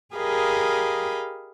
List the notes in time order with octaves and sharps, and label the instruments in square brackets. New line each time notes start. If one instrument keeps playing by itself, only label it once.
[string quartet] G4 G#4 A#4 D#5 F5 B5